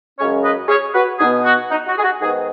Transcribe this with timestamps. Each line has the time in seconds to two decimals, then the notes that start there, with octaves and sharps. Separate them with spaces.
0.18 F#2 C#3 G#3 C#4 G#4 C#5
0.43 B4 D#5
0.68 G#4 C#5
0.94 F#4 B4
1.19 B2 D#4 G#4
1.23 B3
1.45 F#4
1.70 D#4
1.87 F#4
1.98 G#4
2.03 F#4
2.20 G#2 D#3 B3 D#4 G#4